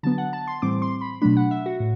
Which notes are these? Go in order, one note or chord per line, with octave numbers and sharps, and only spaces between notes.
D3 F#3 B3 A5
F#5
A5
C6
A2 E3 G3 C4 D6
C6
B5
B2 F#3 A3 D4 B5
F#5
E5
F#4
A2